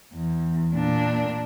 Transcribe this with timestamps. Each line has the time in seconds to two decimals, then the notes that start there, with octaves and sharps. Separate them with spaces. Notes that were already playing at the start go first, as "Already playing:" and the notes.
0.14 E2
0.74 A#2 D4